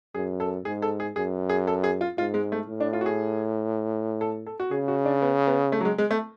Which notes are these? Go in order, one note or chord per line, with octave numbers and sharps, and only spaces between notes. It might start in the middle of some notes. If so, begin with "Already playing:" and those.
F#2 G#4
A4
G#2 G#4
A4
G#4
F#2 G#4
G#4
A4
G#4
F4
G#2 F4
G#3
A3
A2
D4
F4
F#4
G#4
A4
A4
F#4
C#3 G#4
F#4
D4
B3
B3
A3
F#3
G#3
G#3
A3